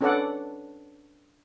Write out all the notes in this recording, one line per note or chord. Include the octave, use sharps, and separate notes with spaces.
C#4 D4 A4 B4 D5 F#5